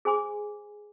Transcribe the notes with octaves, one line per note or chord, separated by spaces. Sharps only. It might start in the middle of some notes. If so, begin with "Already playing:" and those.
G#4 C5 G#5 C6 D6